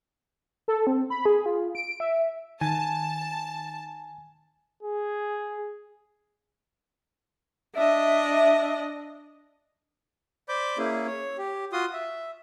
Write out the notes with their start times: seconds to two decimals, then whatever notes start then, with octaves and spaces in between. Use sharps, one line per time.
0.68 A4
0.87 C4
1.10 B5
1.26 G#4
1.46 F4
1.75 D7
2.00 E5
2.61 D#3 G#5 A5
4.83 G#4
7.75 D4 D#5 E5
10.49 C5 D5 B5 D6 G6
10.78 A#3 C#4 E4 G#4
11.07 C#5
11.38 G4
11.73 F4 F#4 C6 D#6
11.93 E5